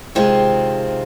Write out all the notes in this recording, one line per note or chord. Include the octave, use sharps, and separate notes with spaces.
C3 D#3 G#3 C4 F4